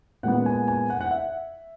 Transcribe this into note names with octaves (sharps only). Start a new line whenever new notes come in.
A#2 G#3 B3 F#5
G#5
G#5
F#5
F#5
E5